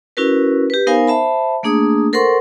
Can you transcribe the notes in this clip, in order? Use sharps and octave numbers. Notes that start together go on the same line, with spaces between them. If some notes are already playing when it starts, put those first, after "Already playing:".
C#4 E4 F#4 A#4 B4
G4 B4
B3 D#4 A#4 C5 F5 G#5
C5 E5 A5 B5
A3 A#3 D4 G#4 D#6
A4 A#4 C5 F#5 C6 C#6